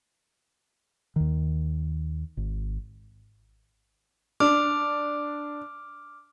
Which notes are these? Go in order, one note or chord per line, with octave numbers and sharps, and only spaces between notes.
D#2 D#3
G#1
D4 D6 F6